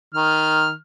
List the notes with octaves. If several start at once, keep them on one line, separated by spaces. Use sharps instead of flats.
D#3 F6